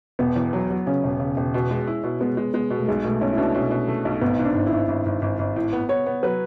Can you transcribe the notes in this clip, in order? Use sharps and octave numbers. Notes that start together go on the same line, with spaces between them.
E1 B3
E2
F#3
F#3
C#3 C#4
E1
C#3
E1
B2
G#3
E4
B2
G#3 B3
G#3
G#3 B3
B2
A3
B1 G#3
B2 A3
B1 C#4
E4
B2 D4
B2 C#4
B2
A3
B1
G#1 B3
G#2
D4
G#1
E4
G#1
G#1
G#1
G#1
G#1
A2
B3
B3 C#5
B3
F#3 B4